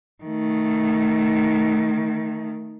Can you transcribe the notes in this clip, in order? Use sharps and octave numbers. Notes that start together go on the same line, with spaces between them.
D#3 A3